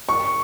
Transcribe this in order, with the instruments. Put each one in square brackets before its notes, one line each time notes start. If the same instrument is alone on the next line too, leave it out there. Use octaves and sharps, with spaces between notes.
[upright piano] C#6